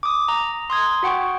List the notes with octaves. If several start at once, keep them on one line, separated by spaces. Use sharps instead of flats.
D6 D#6
A#5
C6 D#6 G#6
F#4 F#5 G5 C#6